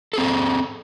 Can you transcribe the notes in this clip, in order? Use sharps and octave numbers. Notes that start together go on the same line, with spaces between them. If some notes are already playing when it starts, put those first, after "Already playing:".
C4 G#4 A4